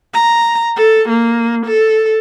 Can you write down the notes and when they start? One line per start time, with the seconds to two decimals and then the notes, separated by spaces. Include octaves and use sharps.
0.13 A#5
0.76 A4
1.09 A#3
1.66 A4